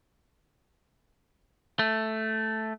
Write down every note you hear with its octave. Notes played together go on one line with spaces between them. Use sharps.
A3